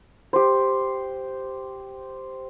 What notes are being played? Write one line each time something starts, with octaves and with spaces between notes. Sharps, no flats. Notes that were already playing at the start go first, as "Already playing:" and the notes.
G4 C5